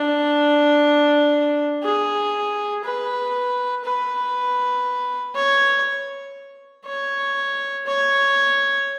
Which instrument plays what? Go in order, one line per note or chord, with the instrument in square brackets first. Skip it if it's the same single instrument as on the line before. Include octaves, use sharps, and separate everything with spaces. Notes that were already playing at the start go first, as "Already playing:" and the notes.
Already playing: [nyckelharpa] D4
G#4
B4
B4
C#5
C#5
C#5